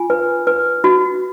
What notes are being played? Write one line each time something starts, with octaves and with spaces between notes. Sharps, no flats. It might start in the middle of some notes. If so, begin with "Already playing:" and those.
Already playing: F4 G#5
B4
B4
F#4